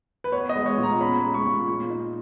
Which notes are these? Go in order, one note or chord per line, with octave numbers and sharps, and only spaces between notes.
B4
B3 C#5
D#5
G#3
C#5
A#2
A#5
C#4 B5
G#3
C#6
A#2
A#2
D#4